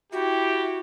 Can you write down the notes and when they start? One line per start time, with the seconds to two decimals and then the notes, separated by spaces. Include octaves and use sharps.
0.12 E4 F#4 G4 G5